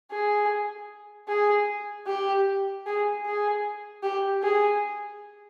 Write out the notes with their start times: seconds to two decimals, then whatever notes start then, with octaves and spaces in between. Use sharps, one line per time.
0.11 G#4
1.28 G#4
2.07 G4
2.86 G#4
3.26 G#4
4.03 G4
4.43 G#4